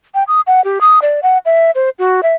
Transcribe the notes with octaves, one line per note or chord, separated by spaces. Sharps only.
G5
D#6
F#5
G4
D#6
D5
F#5
E5
C5
F#4
E5